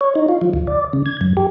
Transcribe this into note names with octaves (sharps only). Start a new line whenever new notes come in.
C#5
D#4
F4
F3
D2
D5
C#3
G#6
F#2
G4